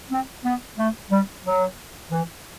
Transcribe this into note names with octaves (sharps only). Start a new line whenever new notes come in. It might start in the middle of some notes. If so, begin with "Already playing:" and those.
C4
B3
A3
G3
F#3
E3